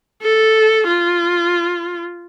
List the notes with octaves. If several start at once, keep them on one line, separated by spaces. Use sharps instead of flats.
A4
F4